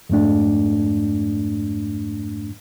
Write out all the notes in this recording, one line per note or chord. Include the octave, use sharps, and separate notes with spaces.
F2 G#2 A3 D4